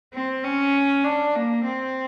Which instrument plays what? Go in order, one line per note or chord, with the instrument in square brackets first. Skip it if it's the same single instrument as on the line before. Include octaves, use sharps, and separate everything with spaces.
[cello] C4
C#4
D4
A#3
C4